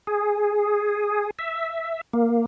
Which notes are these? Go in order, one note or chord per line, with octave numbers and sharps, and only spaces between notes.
G#4
E5
A#3